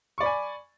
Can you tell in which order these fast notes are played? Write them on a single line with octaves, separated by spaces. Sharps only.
C#6 D5 B5 G#5